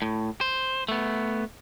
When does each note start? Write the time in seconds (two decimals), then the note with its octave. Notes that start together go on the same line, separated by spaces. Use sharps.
0.02 A2
0.41 C5
0.88 A3 B3